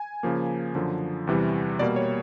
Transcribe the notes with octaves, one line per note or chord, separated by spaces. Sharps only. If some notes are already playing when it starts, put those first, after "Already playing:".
Already playing: G#5
C#3 F3 A#3
F#2 D3 F3
E2 C3 E3 G3
B2 G3 A#3 D5
C#5